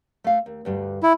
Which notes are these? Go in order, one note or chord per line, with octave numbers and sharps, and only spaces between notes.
A3 F5
D#2
D2 G2 G3
E4